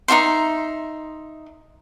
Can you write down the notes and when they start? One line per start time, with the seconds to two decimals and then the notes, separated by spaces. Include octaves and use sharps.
0.08 D#4 F#4 E5 C6